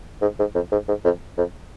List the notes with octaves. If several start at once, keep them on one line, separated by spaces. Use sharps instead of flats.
G#2
G#2
F2
G#2
G#2
F2
F2